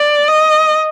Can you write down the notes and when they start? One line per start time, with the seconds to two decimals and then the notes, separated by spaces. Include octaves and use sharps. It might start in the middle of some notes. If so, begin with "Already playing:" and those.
Already playing: D5
0.28 D#5